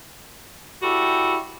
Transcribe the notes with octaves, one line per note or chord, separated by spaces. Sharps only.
G3 E4 F#4 G4 A4